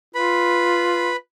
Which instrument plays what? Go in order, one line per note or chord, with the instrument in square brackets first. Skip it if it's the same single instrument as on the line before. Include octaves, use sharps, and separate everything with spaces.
[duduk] F4 [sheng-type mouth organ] B4 B5